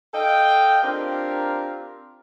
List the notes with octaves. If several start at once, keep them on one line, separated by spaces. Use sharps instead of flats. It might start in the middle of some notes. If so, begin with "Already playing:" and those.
A4 D#5 F5 G5
C4 D4 F4 G4 A#4